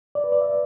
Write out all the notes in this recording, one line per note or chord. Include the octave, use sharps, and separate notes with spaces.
D5
B4
D5
E5